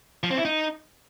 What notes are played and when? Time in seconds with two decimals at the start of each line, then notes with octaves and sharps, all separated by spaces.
0.23 F3
0.31 C4
0.38 E4
0.45 D#4